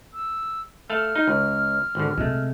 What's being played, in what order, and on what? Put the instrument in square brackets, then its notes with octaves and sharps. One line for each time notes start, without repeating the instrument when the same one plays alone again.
[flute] E6
[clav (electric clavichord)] A3 A4 F5 [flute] F6
[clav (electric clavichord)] D#4
C#2
G#1 D3
[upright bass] C3 [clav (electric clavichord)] G#3 A3